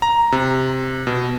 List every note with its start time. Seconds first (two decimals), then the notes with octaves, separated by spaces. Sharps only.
0.02 A#5
0.32 C3
1.07 B2